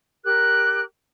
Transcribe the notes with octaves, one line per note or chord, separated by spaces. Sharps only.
G4 A#4 F#6